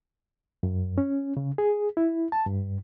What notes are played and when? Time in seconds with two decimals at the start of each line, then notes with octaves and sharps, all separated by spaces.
0.63 F#2
0.98 C#4
1.37 C#3
1.58 G#4
1.97 E4
2.32 A5
2.46 G2